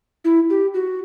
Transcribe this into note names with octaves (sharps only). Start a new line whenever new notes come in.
E4
G4
F#4